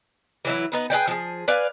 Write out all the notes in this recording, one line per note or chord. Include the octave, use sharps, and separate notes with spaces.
E3 F#3 E4
B3 D#4 B4
G#4 B4 D5 G5
F3 G#4
B4 D5 F5 G#5